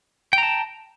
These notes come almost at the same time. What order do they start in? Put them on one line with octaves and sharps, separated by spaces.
G5 A#5 A5